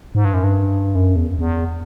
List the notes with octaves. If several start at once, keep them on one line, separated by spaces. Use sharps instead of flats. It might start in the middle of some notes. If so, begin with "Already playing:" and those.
G#2
G2
F#2
G2
F#2
E2
E2